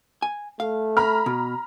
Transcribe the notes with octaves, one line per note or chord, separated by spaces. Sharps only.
G#5
A3 F5
A#5 B5 F6
B2